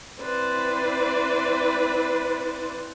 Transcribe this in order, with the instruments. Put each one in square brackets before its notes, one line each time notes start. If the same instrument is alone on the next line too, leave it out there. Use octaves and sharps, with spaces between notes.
[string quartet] C4 E4 B4 C5 D5